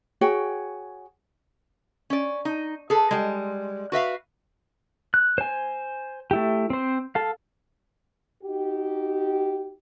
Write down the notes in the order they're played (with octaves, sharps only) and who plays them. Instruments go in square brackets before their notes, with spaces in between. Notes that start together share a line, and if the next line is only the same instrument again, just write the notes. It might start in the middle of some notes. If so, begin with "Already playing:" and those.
[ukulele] F#4 G#4 C#5 G5
[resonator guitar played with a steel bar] C#4 D5
D#4
G#4 A4 B4
G3 G#3
F#4 B4 E5 F5
[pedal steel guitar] F#6
C5 G#5
A3 E4 G4
C4 C5
A4 F5
[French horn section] D#4 F#4 G4